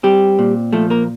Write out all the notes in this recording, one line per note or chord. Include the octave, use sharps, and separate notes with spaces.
G3 C4 G4
A#2
F3 A3 A4
A#3 A#4